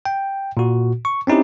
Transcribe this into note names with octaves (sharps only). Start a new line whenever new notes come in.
G5
A#2 F#4
C#6
C4 C#4 D#4 E4 G4